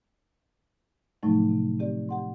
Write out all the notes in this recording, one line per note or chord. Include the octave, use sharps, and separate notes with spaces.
A2 C3 F3 F#3 A3 D#4
C3
C4 G4 D5
G4 F#5 C6